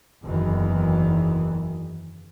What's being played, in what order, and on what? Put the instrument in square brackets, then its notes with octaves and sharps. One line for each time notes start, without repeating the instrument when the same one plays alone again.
[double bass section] F#1 E2 D#3 E3